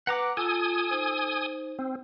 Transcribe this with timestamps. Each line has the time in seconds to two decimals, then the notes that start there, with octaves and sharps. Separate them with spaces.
0.07 B4 F#5 A#5 D6
0.37 F4 A4 G#5 D#6
0.91 D#4 C5
1.79 C4